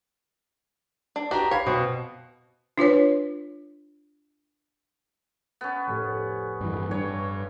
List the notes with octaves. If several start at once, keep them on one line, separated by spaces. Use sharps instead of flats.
D4
B3 D4 F#4 G4 A#5
C#5 F5 B5
B2 C4
D4 F4 B4 C#5
B3 C#4
F1 A2 G4
G2 E3
G2 C#5